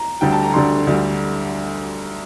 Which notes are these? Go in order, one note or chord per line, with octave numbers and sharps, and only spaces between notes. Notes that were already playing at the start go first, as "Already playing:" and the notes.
Already playing: A#5
D2 D3 G3 G5
A5
A#5
D2 D3 G3 C6
D2 D3 G3